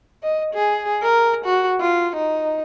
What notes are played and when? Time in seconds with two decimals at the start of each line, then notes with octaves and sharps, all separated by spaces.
0.23 D#5
0.54 G#4
1.02 A#4
1.45 F#4
1.80 F4
2.16 D#4